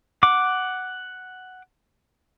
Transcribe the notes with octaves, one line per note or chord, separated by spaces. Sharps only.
F#5 D6